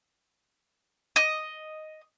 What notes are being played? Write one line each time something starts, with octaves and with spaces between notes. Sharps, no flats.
D#5